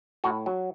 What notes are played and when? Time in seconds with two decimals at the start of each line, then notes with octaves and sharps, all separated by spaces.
0.24 A2 F#4
0.46 F#3